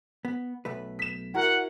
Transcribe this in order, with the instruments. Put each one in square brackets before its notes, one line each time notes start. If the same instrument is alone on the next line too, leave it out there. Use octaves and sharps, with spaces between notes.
[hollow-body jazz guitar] B3
B1 A3 B4
[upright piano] B6 E7
[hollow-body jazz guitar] E4 [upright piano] F#4 A#4 [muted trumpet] F#5